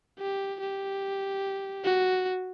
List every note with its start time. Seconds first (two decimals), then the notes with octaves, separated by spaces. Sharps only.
0.19 G4
0.60 G4
1.84 F#4